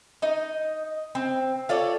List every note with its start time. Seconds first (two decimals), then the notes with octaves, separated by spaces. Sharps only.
0.22 D#4 D#5
1.15 C4
1.69 F4 A4 C#5 D5